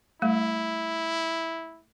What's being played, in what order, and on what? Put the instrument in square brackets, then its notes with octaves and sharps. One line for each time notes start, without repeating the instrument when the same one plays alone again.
[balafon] G3 A3 [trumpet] E4